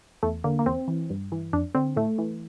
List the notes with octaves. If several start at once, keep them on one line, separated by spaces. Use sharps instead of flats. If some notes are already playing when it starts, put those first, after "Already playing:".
E2 A3
D3 A#3
A#3
E2 C4
E3
G2
E3
F2 D4
D3 C4
A2 A3
E3